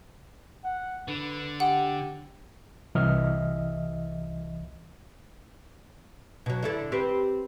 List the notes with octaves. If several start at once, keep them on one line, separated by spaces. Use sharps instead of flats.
F#5
D3 B4
G4 F#5
C2 E3 D#5 E5 F6
B2 F#3
D3 E4 A4
C4 G4 B4